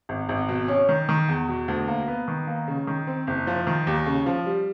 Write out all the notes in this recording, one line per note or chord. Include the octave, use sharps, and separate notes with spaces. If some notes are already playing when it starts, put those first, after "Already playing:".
G#1
G#1
B2
C#4
D#3
D#3
E2
B2
D2
A#3
B3
D#3
A#3
C#3
D#3
C4
F#1
F3
D#3
D#2
C#3
F3
G3